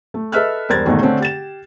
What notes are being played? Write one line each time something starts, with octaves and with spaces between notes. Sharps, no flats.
A3
A4 B4 D#5 E5 F6 F#6
E1 G2 A#4 C5 G#6 A6
E2 G#2 B2 D#3 A3 D#4
D3 A3 C4 C#4
G4 A6 E7